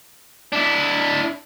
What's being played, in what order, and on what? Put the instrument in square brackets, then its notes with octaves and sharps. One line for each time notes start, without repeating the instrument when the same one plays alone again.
[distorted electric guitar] D4 E4